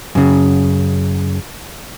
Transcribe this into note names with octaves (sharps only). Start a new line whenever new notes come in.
F#2 C#3